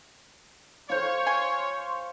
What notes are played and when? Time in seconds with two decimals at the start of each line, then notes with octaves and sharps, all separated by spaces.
0.90 F4 C5 C#5
1.27 G#5 C6 C#6